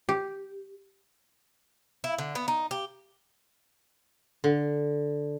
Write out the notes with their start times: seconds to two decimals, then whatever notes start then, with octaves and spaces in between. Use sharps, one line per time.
0.09 G4
2.04 E4
2.18 D3
2.35 B3
2.48 D#4
2.71 G4
4.44 D3